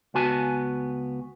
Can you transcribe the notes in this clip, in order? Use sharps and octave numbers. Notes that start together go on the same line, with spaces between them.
C#2 B3 F#4 G#5 A5